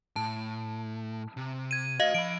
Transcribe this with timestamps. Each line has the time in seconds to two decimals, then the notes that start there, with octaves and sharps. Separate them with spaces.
0.16 A2 A5
1.37 C3
1.71 G#6 D#7
2.00 F#4 C5 D#5 F5
2.14 F3 B5 D7